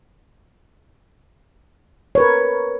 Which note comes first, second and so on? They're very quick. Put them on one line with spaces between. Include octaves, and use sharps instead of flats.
C#5 B4 A#4